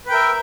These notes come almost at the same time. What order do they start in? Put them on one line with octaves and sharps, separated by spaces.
B4 G5 A#4 E5